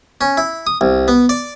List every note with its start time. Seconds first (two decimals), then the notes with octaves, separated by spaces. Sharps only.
0.21 C#4
0.37 E4
0.67 D#6
0.81 C2
1.08 B3
1.29 D5